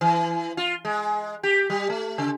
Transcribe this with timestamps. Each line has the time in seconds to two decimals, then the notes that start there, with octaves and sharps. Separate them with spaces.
0.01 E3
0.57 F4
0.85 G#3
1.43 G4
1.70 G3
1.90 A3
2.18 C#3